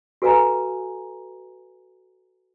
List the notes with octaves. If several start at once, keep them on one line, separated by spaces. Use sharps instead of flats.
F#4 A4 B4 F5 G#5 A#5